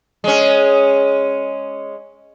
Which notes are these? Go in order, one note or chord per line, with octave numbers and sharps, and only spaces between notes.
G#3 C#4